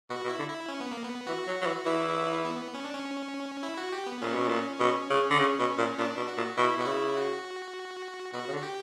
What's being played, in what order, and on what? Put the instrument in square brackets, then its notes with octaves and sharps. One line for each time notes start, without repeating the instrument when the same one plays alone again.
[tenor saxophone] B2 [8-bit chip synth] F#4
[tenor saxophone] B2
[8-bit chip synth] E4
[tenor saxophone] D3
[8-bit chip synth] E4
C#4
B3
A#3
B3
[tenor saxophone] E3 [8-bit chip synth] F#4
[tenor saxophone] F#3
F#3
E3
[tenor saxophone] E3 [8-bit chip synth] E4
[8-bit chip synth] B3
C#4
D4
C#4
E4
F#4
G4
B3
[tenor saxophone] A#2 [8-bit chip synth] C#4
[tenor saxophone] B2
A#2
B2
C#3
D3
C#3
B2
A#2
[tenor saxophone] A#2 [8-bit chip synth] D4
[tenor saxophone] B2
[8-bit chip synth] F#4
[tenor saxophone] A#2
[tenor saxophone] B2 [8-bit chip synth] E4
[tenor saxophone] B2
[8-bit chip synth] F#4
[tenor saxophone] C#3 [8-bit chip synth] E4
[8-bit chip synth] F#4
[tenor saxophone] B2 [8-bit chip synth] F#4
[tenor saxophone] C#3
D3
[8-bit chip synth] F#4
G4